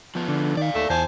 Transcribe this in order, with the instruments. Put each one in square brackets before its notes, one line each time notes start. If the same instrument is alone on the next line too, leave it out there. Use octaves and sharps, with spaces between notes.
[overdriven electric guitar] F3 B3
[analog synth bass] D3
[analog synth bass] D#3 [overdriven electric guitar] D5 F5
[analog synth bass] D#2 [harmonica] A3
[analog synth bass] E2 [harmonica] C5 G#5 A5